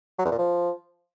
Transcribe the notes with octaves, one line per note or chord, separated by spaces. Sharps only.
F#3
E2
A#2
F3